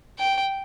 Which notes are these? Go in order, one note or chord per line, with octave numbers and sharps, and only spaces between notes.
G5